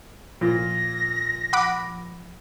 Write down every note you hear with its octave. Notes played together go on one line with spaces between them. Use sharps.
A#2 F3 F4 A#6
F#5 B5 D6